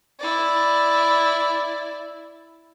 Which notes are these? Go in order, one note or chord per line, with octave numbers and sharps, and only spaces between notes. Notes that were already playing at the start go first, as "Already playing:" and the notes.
E4 D5